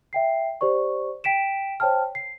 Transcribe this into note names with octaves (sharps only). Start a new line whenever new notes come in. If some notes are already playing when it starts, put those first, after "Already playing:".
E5 G5 C7
G4 C5 D5 C#6
G5 B6 D7 E7
C5 C#5 G5 A5 F6
C7